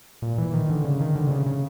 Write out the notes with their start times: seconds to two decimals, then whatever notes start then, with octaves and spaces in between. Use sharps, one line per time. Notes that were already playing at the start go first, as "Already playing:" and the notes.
0.22 A#2
0.38 E3
0.53 D#3
0.70 D3
0.84 C#3
1.01 D#3
1.16 D3
1.27 C3
1.31 C#3
1.46 C#3